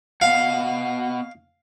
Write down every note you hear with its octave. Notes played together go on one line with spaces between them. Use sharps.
B3 D#5 F5 F#5